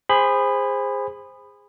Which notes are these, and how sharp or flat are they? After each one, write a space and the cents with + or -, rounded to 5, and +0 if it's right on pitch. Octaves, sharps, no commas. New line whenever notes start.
G#4 -25 C5 +0 B5 +10